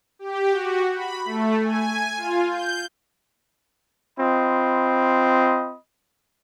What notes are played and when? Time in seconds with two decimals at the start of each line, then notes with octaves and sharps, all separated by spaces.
0.19 G4
0.51 F#4
0.95 B5
1.25 A3
1.63 G#5
2.17 F4
2.50 G6
4.19 C4 F4 D#5 B5